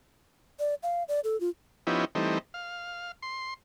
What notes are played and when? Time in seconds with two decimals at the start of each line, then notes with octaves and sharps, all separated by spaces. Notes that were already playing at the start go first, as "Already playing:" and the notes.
0.59 D5
0.83 F5
1.08 D5
1.24 A4
1.41 F4
1.87 F3 B3 C#4 D#4 E4 G4
2.15 E3 G3 A3 C4 D#4
2.54 F5
3.22 C6